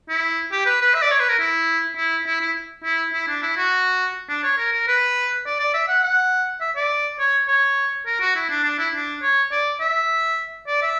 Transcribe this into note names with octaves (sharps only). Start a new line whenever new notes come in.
E4
G4
B4
B4
E5
D5
C#5
B4
A#4
E4
E4
E4
E4
E4
E4
D4
E4
F#4
D4
C#5
A#4
A#4
B4
D5
D5
E5
F#5
F#5
E5
D5
C#5
C#5
A#4
F#4
E4
D4
D4
E4
D4
C#5
D5
E5
D5
E5